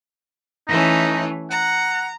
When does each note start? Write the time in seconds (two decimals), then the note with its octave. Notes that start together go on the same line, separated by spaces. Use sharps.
0.68 E3 A3 C#4 D#4
1.50 F#5 A#5